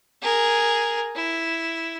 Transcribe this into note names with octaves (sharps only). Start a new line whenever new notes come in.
G#4 A#4
E4